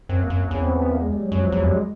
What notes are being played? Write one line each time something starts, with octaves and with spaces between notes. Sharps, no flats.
F#2 C4
A#3
F#2
E2 C#4
C4
B3
B3
A#3
G#3
G3
F#3
F#2 F#3
F3
E2 F#3
F#2 G3
G#3